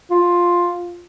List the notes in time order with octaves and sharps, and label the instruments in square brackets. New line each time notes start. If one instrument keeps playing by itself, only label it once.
[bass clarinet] F4